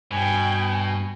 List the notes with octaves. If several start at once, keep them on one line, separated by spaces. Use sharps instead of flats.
G2 B2 G5 G#5